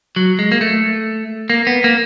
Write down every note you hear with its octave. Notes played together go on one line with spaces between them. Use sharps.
F#3
G#3
A#3
A3
A#3
B3
A#3